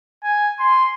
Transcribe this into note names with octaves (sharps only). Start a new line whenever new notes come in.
G#5
C6